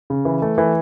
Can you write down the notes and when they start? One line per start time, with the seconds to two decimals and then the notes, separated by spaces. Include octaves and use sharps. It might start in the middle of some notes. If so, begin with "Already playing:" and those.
0.10 C#3
0.25 E3
0.42 A3
0.58 E3